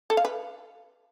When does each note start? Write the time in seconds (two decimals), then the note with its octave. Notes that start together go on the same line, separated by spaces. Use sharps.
0.10 A4
0.17 F5
0.25 B4